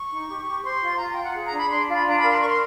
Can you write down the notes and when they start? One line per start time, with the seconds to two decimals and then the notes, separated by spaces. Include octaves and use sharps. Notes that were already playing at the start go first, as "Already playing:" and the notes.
Already playing: C#6
0.10 D#4
0.28 G4
0.45 G4
0.63 C5 C6
0.81 F4
0.98 F4 A#5
1.11 G5
1.16 F4
1.22 F#5
1.34 G#4
1.46 A#5
1.52 D4
1.58 B5
1.70 D4 C6
1.87 F4
1.93 B5
2.05 D4 A#5
2.17 A#4 B5
2.29 C6
2.41 A#4 C#6
2.48 C6